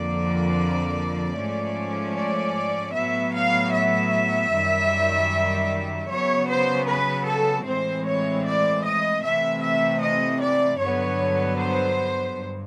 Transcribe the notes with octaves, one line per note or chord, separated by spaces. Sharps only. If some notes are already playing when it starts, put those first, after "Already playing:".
Already playing: F2 D3 F3 A#3 D5
G#2 F3 A3 C#4
D5
A2 F#3 B3 E5
F5
E5
F#2 D#3 G3
C#3 F#3 B3 C#5
C5
B4
A4
A2 E3 G#3 C4 C5
C#5
D5
D#5
C3 E3 A3 E5
E5
D#5
D5
G2 D3 F#3 B3 C#5
C5
G2